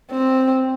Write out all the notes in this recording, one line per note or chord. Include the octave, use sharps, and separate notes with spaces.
C4